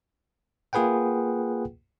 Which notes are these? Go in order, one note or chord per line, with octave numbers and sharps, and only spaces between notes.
A#3 F4 G#4 B4 F#5 G5